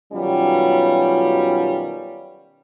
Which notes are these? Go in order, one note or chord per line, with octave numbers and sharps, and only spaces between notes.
B2 D#3 F#3 G3 C#4 F4